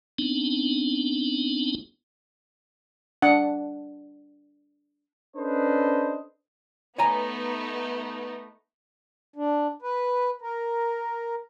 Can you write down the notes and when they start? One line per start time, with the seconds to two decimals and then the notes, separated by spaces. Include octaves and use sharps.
0.18 B3 C4 D4 D#4
3.22 D4 F#5
5.37 C#4 D4 A4 B4 C5 D#5
6.98 A3 B3 D#4 C#5 G#5 A#5
9.36 D4
9.82 B4
10.42 A#4